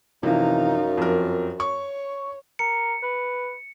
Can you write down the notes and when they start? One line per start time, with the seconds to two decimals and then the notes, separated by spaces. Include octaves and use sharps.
0.23 F#2 C3 E3 F3 D#4 F5
0.98 F2 A#4
1.60 C#5 C#6
2.59 A#4 C#7
3.02 B4